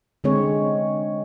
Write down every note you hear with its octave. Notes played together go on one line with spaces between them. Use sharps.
D3 G#3 C4 G#4 C#5